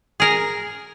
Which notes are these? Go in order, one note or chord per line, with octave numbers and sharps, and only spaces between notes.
G#4 A#4